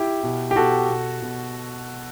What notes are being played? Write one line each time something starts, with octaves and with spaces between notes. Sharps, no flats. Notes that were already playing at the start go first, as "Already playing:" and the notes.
Already playing: E4 G4
B2
G4
B2 F#4 A4
B2
B2